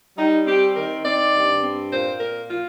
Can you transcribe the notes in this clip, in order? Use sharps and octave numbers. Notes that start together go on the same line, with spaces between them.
G3 D#4
C4 G4
D#3 A#4
C4 D5
G2
C4
A#2 C5
A#3 A#4
A#2 F4